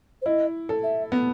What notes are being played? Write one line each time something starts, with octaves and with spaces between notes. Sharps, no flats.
C5
E4 D#5
A4
E5
B3